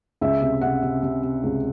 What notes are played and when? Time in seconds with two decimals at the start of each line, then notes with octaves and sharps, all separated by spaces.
0.21 C#2 E5
0.41 C3
0.61 C3 F#5
0.83 C3
1.03 C3
1.23 C3
1.43 C#2